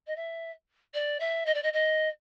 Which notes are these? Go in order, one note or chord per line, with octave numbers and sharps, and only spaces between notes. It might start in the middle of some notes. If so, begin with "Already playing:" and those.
D#5
E5
D5
E5
D#5
D5
D#5
D#5